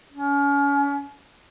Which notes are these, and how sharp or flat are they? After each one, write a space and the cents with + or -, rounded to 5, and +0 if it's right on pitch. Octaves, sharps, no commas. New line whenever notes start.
C#4 +35